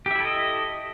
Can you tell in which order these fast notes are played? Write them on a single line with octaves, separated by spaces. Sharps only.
G4 E5 E4 A4 D#5